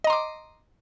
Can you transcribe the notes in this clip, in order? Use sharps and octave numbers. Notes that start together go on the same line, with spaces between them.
D#5 A#5 C6 D6